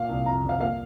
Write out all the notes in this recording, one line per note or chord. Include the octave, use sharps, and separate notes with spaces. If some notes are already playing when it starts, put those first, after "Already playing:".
Already playing: A#2 F5
C2
F2 A#5
G1
F5
A#3 F5